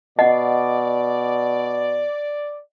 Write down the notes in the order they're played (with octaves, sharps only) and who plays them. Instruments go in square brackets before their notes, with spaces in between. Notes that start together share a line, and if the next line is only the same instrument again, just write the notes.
[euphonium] B2 [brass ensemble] D5 [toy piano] D#5 F#5